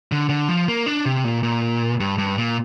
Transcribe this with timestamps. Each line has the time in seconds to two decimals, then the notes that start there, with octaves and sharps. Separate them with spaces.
0.12 D3
0.30 D3
0.48 F3
0.68 A#3
0.86 D4
1.06 C3
1.24 A#2
1.43 A#2
2.00 G2
2.18 G2
2.38 A#2